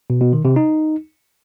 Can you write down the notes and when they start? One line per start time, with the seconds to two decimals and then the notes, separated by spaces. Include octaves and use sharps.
0.10 B2
0.21 B2
0.33 D#3
0.45 C3
0.56 D#4